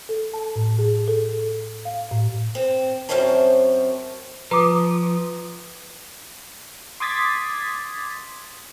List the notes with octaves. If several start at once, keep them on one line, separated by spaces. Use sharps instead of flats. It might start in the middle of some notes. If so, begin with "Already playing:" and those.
A4
A5
A2
G#4
A4
F5
A2
C4
F#2 C4 A#4 C5 C#5 A5
F3 B4 A#5 D6 D#6
C6 D6 D#6 G#6 A6 B6